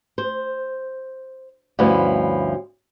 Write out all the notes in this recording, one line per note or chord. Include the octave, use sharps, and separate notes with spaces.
C5
D2 G2 F3 C#4 E4 B4